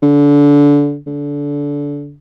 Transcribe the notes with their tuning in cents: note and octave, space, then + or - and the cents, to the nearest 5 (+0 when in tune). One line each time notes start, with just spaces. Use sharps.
D3 -25
D3 -25